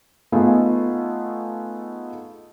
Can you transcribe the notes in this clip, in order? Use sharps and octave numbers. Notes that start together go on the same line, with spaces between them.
A3 B3 D#4 F4 G#4